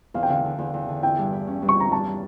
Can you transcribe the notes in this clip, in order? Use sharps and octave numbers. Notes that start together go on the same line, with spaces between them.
E2 F5
G5
D3 F5
D3
E2
E2
D3
E4 G5
G2
E4
C#4
G2
C#6
C#4 A#5
G2 A5
G3